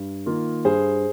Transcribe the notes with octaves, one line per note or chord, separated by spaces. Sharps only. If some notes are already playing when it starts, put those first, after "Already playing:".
Already playing: G2
D#3 A#3 F4
G2 G#4 C5